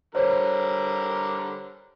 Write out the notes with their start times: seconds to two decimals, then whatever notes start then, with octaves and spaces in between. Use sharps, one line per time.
0.15 D3 G3 A#4 C5 C#5